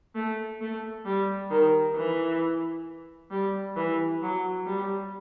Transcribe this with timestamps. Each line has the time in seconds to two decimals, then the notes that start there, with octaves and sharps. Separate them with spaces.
0.15 A3
0.61 A3
1.05 G3
1.51 D#3
1.96 E3
3.31 G3
3.76 E3
4.22 F#3
4.67 G3